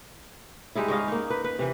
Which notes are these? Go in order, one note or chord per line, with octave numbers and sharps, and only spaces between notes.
G3 G#3 D#4 E4
G#2 C#4 D#5 F5
A#3 D#4
B4
B4
C3 E3